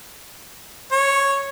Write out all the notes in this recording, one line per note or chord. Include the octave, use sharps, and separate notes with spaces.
C#5